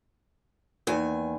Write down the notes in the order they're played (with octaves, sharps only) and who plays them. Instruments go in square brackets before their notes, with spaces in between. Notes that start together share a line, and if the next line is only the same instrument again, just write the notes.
[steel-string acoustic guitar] E2 D#3 G#5 [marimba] A#3 D#4